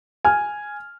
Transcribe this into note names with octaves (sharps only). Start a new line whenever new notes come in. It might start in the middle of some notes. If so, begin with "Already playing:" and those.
G#5 F6